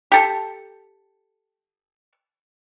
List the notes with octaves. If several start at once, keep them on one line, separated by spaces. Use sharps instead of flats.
G4 A4